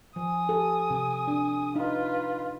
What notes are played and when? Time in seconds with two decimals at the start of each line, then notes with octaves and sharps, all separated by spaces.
0.16 F3 G#5 D#6
0.49 G4 A4
0.90 C3
1.27 D4
1.76 D#4 F4 B4